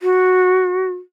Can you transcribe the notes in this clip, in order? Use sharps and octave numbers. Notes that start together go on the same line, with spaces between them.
F#4